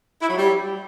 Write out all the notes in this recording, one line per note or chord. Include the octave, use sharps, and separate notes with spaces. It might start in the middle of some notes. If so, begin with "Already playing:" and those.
E4
F#3
G3